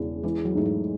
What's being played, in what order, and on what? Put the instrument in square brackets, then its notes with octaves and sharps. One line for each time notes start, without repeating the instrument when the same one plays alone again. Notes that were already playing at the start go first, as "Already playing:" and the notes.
Already playing: [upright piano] E1 E2 C#3
[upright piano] E3 [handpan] G#3
[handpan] F#3
[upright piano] G#2 [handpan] A3
[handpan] G#3